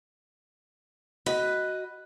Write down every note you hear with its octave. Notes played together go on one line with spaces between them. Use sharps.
F#4 B4 D#5